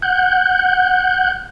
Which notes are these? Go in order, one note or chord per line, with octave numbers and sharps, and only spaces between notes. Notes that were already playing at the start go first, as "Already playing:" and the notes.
F#5 F#6 G6